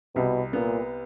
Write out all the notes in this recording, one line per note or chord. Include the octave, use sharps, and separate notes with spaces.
C2 B2
A#2 B3